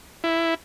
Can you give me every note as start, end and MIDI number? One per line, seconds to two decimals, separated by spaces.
0.24 0.54 64